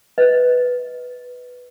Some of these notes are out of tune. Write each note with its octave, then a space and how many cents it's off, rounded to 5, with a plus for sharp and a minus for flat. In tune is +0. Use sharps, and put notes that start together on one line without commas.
B4 +0 D#5 +15